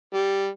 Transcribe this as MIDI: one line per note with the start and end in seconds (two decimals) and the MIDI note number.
0.14 0.48 55